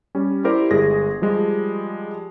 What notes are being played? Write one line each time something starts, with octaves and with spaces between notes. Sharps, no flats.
G3 C#4
E4 G4 A#4 C5 D5
G1 G#3 G#4 A#6
F3 G3 G#3